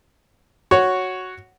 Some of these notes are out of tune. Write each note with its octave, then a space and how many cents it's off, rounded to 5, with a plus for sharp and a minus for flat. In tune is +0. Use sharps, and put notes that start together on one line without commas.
F#4 +0 C#5 +0